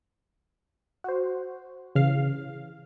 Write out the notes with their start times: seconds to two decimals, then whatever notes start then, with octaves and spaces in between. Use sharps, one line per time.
1.04 F#4 C5
1.95 C#3 E3 F5